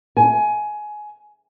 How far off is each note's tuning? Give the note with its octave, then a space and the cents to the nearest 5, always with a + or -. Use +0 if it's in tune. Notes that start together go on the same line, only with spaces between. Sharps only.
G#5 +20